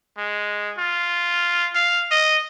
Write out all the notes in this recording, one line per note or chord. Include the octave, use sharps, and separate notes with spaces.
G#3
F4
F5
D#5